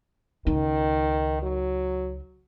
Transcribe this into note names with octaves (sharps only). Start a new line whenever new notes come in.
C#2 D#3 D#4
F#3